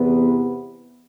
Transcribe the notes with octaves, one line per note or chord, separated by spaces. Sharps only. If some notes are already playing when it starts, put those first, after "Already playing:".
Already playing: E2 C3 E3 B3